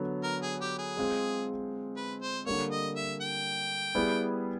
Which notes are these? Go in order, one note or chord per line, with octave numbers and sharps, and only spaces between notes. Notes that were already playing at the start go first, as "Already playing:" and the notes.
Already playing: D3 F#3 B3
A#4
G#4
G4
G#4
G#3 C4 F4
B4
C5
D3 G3 A#3 C#5
D#5
E5
G5
G3 B3 E4 G#4